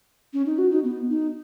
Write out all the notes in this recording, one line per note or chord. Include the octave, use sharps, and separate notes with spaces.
C#4
D#4
F#4
D#4
B3
D#4